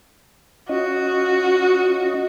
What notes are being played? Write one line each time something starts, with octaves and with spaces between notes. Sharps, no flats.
C#4 F4 F#4 D#5